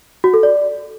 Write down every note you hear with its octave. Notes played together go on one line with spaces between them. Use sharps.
F#4
A4
D5